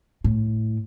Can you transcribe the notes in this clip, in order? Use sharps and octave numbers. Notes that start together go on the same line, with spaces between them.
A2